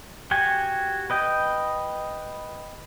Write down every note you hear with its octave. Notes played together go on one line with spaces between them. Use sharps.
F#4 G4 G#5
B4 D#5 G5